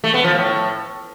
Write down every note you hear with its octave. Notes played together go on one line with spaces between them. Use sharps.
A3
B3
F3
A2